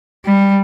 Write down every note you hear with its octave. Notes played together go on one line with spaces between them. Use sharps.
G3